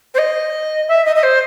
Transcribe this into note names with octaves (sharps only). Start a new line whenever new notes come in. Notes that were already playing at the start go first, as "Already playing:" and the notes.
C5
D#5
E5
D#5
D#5
C5